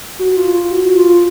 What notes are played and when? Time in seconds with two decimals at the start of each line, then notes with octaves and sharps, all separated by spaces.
0.19 F#4
0.37 F4
0.54 F4
0.71 F#4
0.97 F4